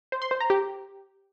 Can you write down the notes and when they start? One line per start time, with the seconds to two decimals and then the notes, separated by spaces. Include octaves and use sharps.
0.12 C5
0.22 C6
0.31 C5
0.40 A#5
0.50 G4